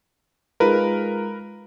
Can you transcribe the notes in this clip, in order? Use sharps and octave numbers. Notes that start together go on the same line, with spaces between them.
G#3 D#4 F4 A#4 B4